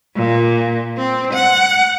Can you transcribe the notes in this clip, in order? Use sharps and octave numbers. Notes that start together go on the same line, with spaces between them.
A#2
C4
F#5